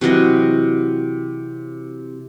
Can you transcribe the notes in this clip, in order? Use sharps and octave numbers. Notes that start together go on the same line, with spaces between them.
C3 E3 F#3 D#5